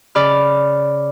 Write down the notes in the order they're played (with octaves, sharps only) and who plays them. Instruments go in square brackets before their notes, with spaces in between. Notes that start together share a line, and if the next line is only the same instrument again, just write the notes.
[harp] C#3 D5 B5 F6